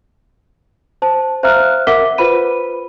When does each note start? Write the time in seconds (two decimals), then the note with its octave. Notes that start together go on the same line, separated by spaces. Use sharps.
1.02 C5 A5
1.43 C5 E5 F5 A#5 F6 F#6
1.87 A#4 E5 F#5 D6 B6 G7
2.18 F4 B4 C5 B5 D#7